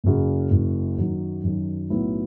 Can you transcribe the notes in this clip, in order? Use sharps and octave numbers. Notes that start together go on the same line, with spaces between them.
F#1 F#2 C#3
F#1 F#2 C#3
F#2 D#3 F#3
F#2 D#3 F#3
B1 A2 F#3 B3 E4